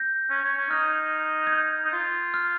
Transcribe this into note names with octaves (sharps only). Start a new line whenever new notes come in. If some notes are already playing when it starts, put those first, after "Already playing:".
Already playing: G6 A#6
C#4
C#4
C#4
D#4 F6 G#6
G#6
G6
D#4
F4
F6